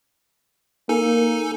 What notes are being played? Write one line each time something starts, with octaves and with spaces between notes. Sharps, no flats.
A#3 D#4 A4 G#5